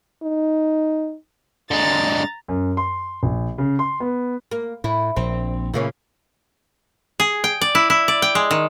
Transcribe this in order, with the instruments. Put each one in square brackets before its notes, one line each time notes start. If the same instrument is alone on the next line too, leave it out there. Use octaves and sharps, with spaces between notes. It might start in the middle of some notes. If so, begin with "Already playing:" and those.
[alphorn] D#4
[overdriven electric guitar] D3 G#3 [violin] A#5 A6
[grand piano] F#2
C6
A#1
C#3
C6
B3
[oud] A#3
[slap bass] A2 [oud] E4
[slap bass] A#1 [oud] C4
[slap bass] A#2 C#3 [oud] E3 A#3 C#4
[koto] G#4
G5
D5
E4
E4
D5
G5
G#3
D#3